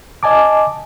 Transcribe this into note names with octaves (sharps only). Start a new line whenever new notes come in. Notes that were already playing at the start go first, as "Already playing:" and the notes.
D#5 G#5 A5 D6